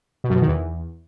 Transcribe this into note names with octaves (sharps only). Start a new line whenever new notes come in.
B2
F#2
B2
D#3
E2